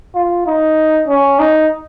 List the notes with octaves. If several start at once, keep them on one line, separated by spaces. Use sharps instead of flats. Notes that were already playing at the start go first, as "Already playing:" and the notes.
F4
D#4
C#4
D#4